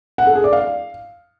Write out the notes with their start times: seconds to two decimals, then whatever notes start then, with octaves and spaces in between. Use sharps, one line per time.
0.18 F#5
0.27 A4
0.35 G#4
0.44 D5
0.53 F5